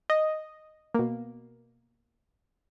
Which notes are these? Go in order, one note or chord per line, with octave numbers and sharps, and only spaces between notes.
D#5
B2 A#3